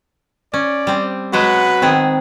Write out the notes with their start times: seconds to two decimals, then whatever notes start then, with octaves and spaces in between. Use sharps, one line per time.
0.54 C#4 D5
0.87 G3 C4
1.33 F#3 G#3 F#4 B4 F#5
1.82 D#3 B3 C4 G#4